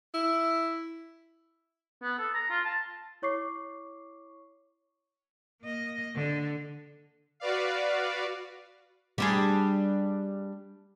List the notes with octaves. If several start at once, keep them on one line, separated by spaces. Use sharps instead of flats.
E4
B3
A4
A#5
F4
A5
E4 C#5 C#6 D6 C7
A#3 D#5
D3
F#4 B4 D5 F5
G3 D4 G#4